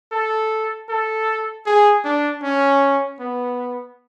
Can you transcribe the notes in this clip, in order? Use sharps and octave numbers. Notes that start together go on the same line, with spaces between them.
A4
A4
G#4
D4
C#4
B3